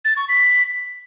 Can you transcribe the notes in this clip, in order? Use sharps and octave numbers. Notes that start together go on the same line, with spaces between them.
A6
C#6
B6